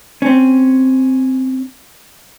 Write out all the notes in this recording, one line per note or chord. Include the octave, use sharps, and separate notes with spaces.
C4 C#4